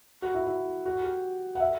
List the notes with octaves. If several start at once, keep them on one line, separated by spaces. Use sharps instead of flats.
F#4
E4
E4
F#4
G4
F#5
E5